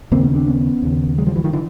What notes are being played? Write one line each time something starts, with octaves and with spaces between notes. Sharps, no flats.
D#2 C#3 A#3 C4
B3 C#4
C4 D4
B3 C#4
D#2 C#3
F#3 G#3
F3 G3
E3 F#3
D#3 F3
D3 E3